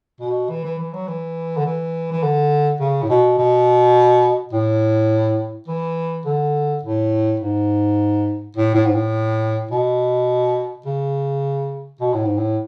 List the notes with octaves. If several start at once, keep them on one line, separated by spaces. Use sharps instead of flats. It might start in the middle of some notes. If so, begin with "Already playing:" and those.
B2
E3
E3
E3
F#3
E3
D3
E3
E3
D3
C#3
A2
B2
B2
A2
E3
D3
A2
G#2
A2
A2
G#2
A2
B2
C#3
B2
A2
G#2
A2